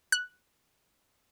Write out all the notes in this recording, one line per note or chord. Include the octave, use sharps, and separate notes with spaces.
F#6